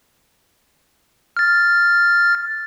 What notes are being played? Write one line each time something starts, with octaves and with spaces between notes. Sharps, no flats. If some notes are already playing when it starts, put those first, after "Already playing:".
F6 A6